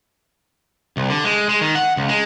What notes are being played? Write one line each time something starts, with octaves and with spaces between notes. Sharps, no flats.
C2
D3
G#3
G#3
D#3
F#5
C#2
G#3